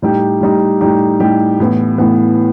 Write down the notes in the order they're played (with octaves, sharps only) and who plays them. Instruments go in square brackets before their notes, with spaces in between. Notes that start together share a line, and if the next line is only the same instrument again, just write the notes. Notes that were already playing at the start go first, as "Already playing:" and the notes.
[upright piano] A2 G3 D#4 G4
A2 G3 D#4 G4
A2 G3 D#4 G4
A2 G3 D#4 G4
A2 E3 B3
A2 E3 B3